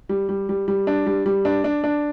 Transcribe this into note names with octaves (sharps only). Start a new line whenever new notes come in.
G3
G3
G3
G3
D4
G3
G3
D4
D4
D4